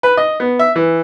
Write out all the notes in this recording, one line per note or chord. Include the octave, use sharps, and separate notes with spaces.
B4
D#5
B3
E5
E3